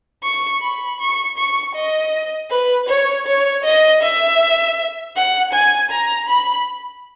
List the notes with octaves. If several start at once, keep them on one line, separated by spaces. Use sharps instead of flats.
C#6
B5
C#6
C#6
D#5
B4
C#5
C#5
D#5
E5
F#5
G#5
A#5
B5